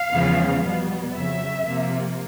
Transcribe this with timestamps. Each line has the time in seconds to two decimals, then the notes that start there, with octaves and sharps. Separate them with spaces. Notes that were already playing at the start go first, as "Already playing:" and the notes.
Already playing: F5
0.11 E2 C#3 F3 G#3 B3
0.63 B2 G3 B3
1.14 F2 C#3 F#3 E5
1.65 C3 F3 A#3